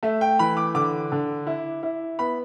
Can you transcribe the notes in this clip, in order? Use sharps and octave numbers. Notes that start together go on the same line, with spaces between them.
A3 E5
G5
E3 B5
D6
D3 D6
D3
E4
E4
B3 B5